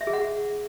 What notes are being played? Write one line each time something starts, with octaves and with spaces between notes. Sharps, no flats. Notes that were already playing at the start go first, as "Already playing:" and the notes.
E5
G#4
F#5